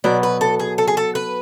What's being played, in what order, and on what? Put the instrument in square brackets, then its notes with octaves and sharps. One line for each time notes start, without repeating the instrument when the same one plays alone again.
[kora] B2 F#3 B3 [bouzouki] D5
[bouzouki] B4
A4
G#4
A4
G#4
A4
B4